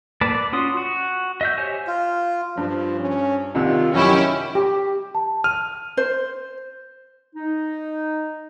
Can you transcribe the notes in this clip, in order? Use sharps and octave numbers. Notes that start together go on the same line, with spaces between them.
A#3 B4 D5 A5
D5
C#4 F4 F#4 C6 D#6
F#4
D#5 E5 G6
G4 C5 C#5 E5 G#5
F4
G2 F3
C#4
C2 C3 D#3 F4
F#2 D#3 F#3 C#4 E4 G4 G#5
G4
A5
F6 D#7
C5
D#4